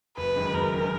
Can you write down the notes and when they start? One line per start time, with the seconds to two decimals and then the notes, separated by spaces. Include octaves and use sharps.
0.17 F#1 B4
0.36 F#2 D#3 G#3
0.54 F#1 A#4
0.72 F#2 D#3 G#3